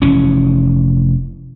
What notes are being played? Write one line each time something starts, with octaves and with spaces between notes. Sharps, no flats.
F1 E3 C#4